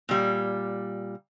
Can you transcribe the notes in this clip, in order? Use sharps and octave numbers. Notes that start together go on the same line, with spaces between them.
A#2 G3